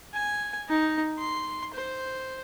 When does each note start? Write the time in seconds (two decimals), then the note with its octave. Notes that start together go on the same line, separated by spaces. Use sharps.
0.14 G#5
0.69 D#4
1.18 C6
1.74 C5